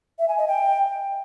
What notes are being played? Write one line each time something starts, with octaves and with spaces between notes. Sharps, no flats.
E5
G#5
D#5
G5